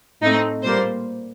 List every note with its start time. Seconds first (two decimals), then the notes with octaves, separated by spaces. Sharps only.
0.22 A2 A3 C4 D#4
0.64 A#2 G3 A#3 C5